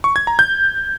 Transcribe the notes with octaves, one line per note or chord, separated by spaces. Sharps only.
C#6
G#6
A#5
G6